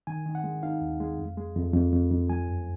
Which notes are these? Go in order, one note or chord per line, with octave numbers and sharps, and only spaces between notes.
D#3 G#5
D#3
F#5
G#3
D#4 F5
D#2
G#3
F2
G#3
F2
F2
F2
F2
F3 G#5
F#2